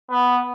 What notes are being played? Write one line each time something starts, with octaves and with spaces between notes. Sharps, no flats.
B3